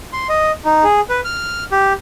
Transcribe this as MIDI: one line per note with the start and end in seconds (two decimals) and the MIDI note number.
0.13 0.27 84
0.29 0.52 75
0.65 0.84 63
0.84 1.00 68
1.09 1.21 71
1.24 1.64 89
1.71 1.93 67